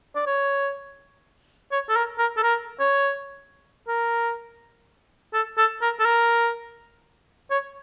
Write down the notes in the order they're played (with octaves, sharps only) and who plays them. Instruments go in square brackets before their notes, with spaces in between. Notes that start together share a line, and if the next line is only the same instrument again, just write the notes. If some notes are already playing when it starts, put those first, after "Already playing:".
[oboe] D5
C#5
C#5
A4
A#4
A#4
A4
A#4
C#5
A#4
A4
A4
A#4
A4
A#4
C#5